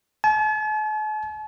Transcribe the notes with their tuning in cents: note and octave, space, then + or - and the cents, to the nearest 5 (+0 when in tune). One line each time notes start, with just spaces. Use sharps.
A5 -45